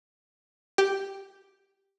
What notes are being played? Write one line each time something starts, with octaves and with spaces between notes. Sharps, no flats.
G4